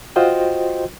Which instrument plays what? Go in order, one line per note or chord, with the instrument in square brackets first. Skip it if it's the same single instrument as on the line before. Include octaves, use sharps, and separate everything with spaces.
[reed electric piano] F4 F#4 C5 D#5 G5